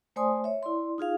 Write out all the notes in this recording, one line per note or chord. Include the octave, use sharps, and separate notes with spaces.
A3 C5 D5 G#5 C6 D#6
C#5 E5
E4 D5 C6
D#4 F4 G#4 F5